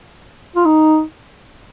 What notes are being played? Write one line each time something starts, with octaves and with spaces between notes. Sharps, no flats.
F4
D#4